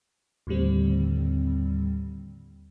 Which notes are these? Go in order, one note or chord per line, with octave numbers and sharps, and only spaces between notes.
D#2 A2 D3 G3 C4